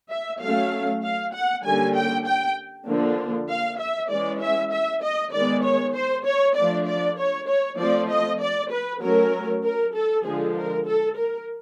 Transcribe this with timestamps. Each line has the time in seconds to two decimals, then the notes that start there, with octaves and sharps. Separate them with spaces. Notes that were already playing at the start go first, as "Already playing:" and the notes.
0.10 E5
0.41 F#3 A3 C#4 F5
1.03 F5
1.33 F#5
1.64 D3 G3 A#3 C#4 G#5
1.95 G5
2.26 G5
2.87 D3 F3 A#3 D4
3.49 F5
3.79 E5
4.10 E3 G#3 C#4 D5
4.40 E5
4.72 E5
5.03 D#5
5.33 D#3 G#3 B3 D5
5.63 C#5
5.94 C5
6.25 C#5
6.55 F3 A3 D4 D5
6.87 D5
7.18 C#5
7.48 C#5
7.79 F3 A3 C4 D5
8.10 D#5
8.41 D5
8.71 B4
9.01 F#3 A3 C#4 A#4
9.63 A#4
9.95 A4
10.25 D3 F3 G#3 G#4
10.56 A#4
10.86 A4
11.17 A#4